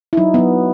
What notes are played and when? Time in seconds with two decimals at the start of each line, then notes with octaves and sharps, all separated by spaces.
0.13 E4
0.17 F#3 D#4
0.34 F#3 B3